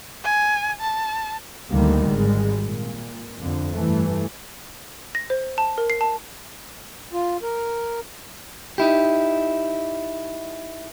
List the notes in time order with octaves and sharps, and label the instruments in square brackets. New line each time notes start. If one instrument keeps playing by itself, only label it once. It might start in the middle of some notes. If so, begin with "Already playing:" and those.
[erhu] G#5
A5
[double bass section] D2 D3 D#3 G3 A#3
G#1 G3 G#3
A#2
F2 D3
G2 E3 A3
[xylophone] A#6
C5
A5
A#4
C7
A5
[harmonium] F4
A#4
[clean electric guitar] D#4 E4 G4